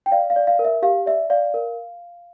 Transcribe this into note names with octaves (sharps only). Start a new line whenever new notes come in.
G5
D5 F5
F5
D5
F5
A#4
E5
G4 F5
D5 E5
D5 F5
A#4